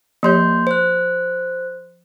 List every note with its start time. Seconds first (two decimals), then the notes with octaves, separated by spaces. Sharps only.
0.23 F3 A#3 G4 C#5 C6 G6
0.67 C5 F#6